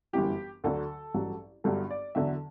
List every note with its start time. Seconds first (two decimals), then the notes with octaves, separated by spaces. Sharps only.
0.13 G1 F#2 E3 G4
0.64 D2 D3 F#3 A4
1.14 A1 G2 F#3
1.64 G1 G2 F#3 A4
1.91 D5
2.15 E2 D3 F#3 E5